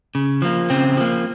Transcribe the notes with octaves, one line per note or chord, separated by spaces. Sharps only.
C#3
F3 A#3
C#3 C4
F3 A#3